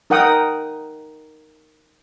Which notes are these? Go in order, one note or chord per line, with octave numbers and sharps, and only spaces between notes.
D#4 A#4 F#5 G5 D#6